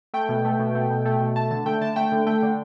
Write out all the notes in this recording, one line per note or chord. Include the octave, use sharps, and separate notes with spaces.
A3 G5
B2
A3
B2
A3
B2
A3
B2
A3 A5
D3 A5
A3 G5
D3 A5
A3 G5
D3
A3 G5
D3